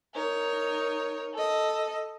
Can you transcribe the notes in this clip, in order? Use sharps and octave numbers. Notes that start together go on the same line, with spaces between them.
D#4 A#4 C#5
A4 D#5